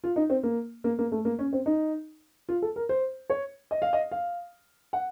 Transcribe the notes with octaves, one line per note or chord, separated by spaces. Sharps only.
F4
D#4
C4
A#3
A#3
A#3
A3
A#3
C#4
C4
D#4
F4
A4
A#4
C5
C#5
D#5
F5
D#5
F5
F#5